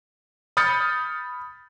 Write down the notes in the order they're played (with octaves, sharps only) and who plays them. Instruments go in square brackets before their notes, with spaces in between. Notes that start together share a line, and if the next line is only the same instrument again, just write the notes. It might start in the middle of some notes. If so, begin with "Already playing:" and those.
[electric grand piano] B5 D#6 F6 G6 A6 C#7